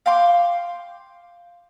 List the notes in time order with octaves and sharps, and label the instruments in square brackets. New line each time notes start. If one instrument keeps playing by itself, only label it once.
[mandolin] F5 G5 C6 D6